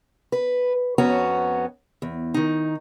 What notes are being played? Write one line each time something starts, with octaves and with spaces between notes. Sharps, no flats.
B4
F2 B3 C#4 F#4 A#5
E2
D#3 D#4